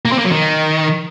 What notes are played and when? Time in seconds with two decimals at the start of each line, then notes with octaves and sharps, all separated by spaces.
0.05 A#3
0.12 C4
0.19 A#3
0.25 F#3
0.32 D#3